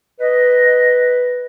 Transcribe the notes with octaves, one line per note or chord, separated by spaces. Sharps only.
B4 D#5